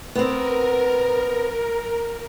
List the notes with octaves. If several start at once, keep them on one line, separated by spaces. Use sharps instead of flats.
B3 C4 A#4